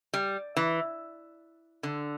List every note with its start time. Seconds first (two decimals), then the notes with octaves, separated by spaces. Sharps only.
0.13 G3
0.57 E3
1.83 D3